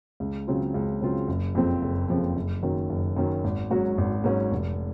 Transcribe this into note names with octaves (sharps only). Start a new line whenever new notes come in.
C#2
C#3 F#3 C4 F4
C#2
C#3 F#3 C4 F4
F#1
F2 C#3 F3 C4
F#1
F2 C#3 F3 C4
F#1
F#2 D#3 F#3
F#1
F#2 D#3 F#3
G#1
G#2 F#3 C#4 F#4
G#1
G#2 F#3 C#4 F#4
F1